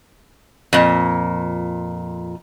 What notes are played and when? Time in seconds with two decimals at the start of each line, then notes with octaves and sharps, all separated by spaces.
0.73 F2 A#2